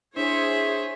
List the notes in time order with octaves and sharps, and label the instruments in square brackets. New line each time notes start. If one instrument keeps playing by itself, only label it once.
[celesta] D4 [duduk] E4 [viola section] G#4 C5 C#5 [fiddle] E5